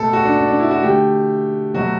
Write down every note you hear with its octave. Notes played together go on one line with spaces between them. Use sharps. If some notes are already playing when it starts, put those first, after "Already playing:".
Already playing: B2 A3 A4
F#4
D4
D4
D4
E4
F#4
D3 A3 G4
B2 F#3 A3 F#4